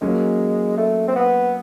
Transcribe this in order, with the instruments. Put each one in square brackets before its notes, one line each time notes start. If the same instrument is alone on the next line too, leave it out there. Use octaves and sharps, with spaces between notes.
[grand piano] F#3 A#3 C#4 [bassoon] G#3
[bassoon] A3
C4
B3